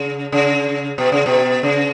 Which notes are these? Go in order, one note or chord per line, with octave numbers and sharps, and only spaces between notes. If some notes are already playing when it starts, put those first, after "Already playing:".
Already playing: C#3
C#3
B2
C#3
B2
C#3